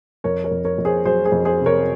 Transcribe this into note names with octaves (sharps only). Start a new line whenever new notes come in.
F2 A#4 C#5
A#4 C#5
F2
A#4 C#5
F2
G#4 C5
F#3 G#4 C5
G#4 C5
F2
G#4 C5
C3
A#4 C#5